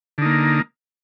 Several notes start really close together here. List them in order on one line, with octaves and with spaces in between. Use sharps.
D3 D#4 A#3